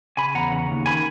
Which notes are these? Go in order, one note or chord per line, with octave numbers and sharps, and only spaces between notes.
C#3 G#5 B5
E2 F#5 A#5
C#3
D#2
D#3 G#5 B5